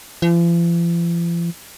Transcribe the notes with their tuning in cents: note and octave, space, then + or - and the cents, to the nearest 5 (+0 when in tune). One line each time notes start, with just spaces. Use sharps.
F3 -45